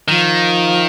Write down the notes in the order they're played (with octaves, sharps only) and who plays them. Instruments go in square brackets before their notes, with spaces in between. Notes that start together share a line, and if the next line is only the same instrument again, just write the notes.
[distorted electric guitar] D#3 [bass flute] F3